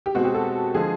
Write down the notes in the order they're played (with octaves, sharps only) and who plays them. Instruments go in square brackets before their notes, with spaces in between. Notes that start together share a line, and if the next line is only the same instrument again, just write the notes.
[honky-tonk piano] G4
[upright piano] B2 G#3 C4 [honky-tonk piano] F#4
[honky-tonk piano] G4
A4
[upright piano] D3 F3 G#3 [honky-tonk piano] G#4